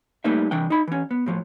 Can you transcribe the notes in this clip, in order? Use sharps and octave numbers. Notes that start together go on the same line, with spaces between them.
G3 A3 A#3 D#4 B4 E5
C3 E3 D4 G5
D#4 B5
E3 C#4
B3
A2 F3 F#3